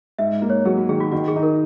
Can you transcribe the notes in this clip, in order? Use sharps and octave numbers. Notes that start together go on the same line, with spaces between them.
G#2 E5
A#3
C#5
F#3 G#4
F#4
D#3 G#4
F#4
D#3 F#4
G#4
D#4
A#4